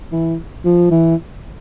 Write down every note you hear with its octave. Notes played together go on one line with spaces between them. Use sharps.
E3
F3
E3